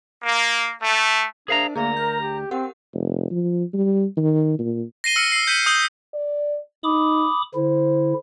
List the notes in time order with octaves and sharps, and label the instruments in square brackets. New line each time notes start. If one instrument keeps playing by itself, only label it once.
[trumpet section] A#3
A3
[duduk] D4 [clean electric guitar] G#4 F5 A#5 [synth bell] A#4 C5 E5
[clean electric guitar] D2 [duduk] A#3 [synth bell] G#4 A#4 D5 [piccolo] A#5
[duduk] A#4 [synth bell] G6
[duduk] G4
[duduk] C4 [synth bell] G4 A#4 F#5
[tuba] F1
F3
G3
D#3
A#2
[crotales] A#6 C7 D#7 G7
E6 F6 C#7 D#7
E6 C7
G6 B6 D#7
D#6 G6 C7 G7
[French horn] D5
[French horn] D#4 [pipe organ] B5 D6 D#6
[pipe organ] D3 E4 [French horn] C5